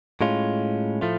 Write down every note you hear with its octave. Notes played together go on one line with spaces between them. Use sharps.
A2 G#3 C#4 F4
A2 F3 A3 F4